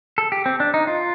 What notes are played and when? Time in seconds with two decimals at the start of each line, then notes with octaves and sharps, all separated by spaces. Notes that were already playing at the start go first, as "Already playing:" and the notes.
0.18 A4
0.32 G4
0.46 C4
0.60 D4
0.74 D#4
0.87 F4